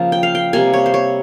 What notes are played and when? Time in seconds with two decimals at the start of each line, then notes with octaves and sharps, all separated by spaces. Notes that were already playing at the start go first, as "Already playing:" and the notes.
Already playing: C#3 F3 A#3
0.12 G5
0.23 F5
0.35 G5
0.53 C3 G3 A#3 G#5
0.73 C#5
0.86 C5
0.94 C#5